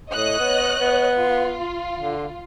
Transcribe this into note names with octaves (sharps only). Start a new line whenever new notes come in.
A2 C#5 D#5 F#6
B3
B3
F4
D3